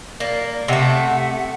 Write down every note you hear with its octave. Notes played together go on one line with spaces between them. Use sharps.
A#3 D5
C3 A3 F#5